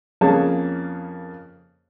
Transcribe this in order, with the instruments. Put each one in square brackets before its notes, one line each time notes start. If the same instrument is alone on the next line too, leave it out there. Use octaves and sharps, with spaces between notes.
[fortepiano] F2 C#3 A#3 G#4 C#5 A5